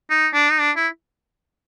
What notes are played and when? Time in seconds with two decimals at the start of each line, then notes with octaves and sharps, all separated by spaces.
0.10 D#4
0.34 D4
0.51 D#4
0.60 D4
0.76 E4